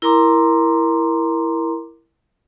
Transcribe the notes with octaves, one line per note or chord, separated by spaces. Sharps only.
E4 A#4 A#5 C6 D6